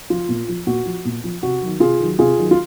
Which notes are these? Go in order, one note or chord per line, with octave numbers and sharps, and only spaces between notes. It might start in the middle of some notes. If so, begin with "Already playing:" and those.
F3 F4
A#2
F3
A#2 F#4
F3
A#2
F3
C3 F#4
D#3 F#3
C3 F4 G#4
D#3 F#3
C3 F4 G#4
D#3 F#3
F4